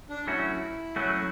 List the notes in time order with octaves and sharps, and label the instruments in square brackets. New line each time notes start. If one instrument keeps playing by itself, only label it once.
[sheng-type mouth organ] D4
[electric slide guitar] F#3 A3 C#4 F#4 [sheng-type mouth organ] E4
[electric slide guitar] F#3 A3 C#4 F#4